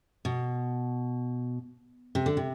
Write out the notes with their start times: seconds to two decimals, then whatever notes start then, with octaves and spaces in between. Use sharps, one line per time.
0.25 B2
2.15 C3
2.26 D3
2.37 C3